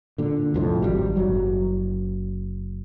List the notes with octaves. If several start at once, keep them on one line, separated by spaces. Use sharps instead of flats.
A#2 D3
C2 F2 A2
G#1 F#3 G3
F#1 F#3